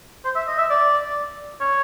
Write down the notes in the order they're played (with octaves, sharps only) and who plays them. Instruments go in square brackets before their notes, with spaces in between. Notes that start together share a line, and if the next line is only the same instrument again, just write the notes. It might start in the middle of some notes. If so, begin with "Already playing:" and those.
[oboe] C5
E5
D#5
E5
D5
C#5